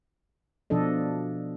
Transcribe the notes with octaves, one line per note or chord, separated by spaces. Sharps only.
B2 F3 D4 A4 D#5